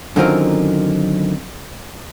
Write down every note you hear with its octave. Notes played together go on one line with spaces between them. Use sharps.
F#2 D3 D#3 C4 F4 A#4